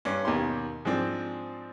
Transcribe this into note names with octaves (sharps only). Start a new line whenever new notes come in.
G2 C#4
D#2 B2 G4 C6
G#2 F3 C4 D4